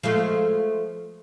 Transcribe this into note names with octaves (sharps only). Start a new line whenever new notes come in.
F3 G#3 A3